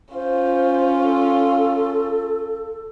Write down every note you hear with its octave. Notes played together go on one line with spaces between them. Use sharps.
C#4 F4 C5
A4